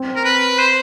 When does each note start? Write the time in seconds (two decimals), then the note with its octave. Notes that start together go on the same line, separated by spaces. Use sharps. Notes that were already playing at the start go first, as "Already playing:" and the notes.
Already playing: C4
0.16 A#4
0.25 B4
0.58 C5